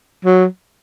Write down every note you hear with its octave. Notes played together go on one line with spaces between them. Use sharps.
F#3